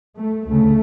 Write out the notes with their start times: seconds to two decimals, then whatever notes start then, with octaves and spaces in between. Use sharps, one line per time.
0.17 A3
0.46 D2 C#3 A3